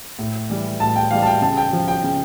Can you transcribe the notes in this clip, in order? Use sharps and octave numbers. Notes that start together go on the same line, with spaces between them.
A2
E3 G3
A2 A5
G5
E3 G3 F5
A5
G5
C#3 A5
G5
F3
G5
C#3